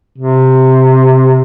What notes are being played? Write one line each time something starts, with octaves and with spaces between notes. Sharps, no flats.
C3